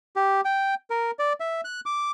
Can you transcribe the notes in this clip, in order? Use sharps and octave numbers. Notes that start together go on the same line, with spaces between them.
G4
G5
A#4
D5
E5
F#6
D6